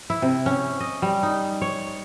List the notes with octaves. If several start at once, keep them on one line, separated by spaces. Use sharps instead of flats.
E4
C3
C#4
D#5
G3
D#4
C#5